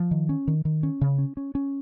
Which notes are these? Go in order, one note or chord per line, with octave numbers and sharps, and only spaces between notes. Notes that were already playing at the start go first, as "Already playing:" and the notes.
Already playing: F3
D#3
C#4
D#3
D#3
C#4
C#3
C#4
C#4
C#4